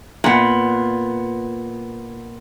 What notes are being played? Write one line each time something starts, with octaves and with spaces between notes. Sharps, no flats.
A#2 B3